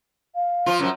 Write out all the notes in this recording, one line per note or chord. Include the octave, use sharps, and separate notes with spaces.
F5
F3 F4
F#2 F3